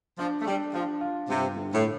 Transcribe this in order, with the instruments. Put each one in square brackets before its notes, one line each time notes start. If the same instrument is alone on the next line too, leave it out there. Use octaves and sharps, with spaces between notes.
[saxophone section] F3 [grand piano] D4
[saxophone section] A3
[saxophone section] G3 [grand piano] D4
[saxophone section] F3 [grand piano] D4
[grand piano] F4
[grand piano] G2 [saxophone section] C3
[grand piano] D3
[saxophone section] A2